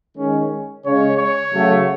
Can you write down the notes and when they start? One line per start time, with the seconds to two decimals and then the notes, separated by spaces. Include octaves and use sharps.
0.15 D#3 G#3 C#4
0.84 C#3 G#3 C#4 C#5
1.18 C#5
1.52 C#3 F#3 A3